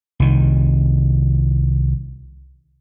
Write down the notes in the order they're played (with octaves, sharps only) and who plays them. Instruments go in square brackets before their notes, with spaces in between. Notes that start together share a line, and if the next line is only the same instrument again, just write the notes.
[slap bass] C2 D#3